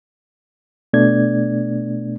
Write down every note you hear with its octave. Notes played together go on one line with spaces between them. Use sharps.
B2 A3 B3 D4 D5 G#6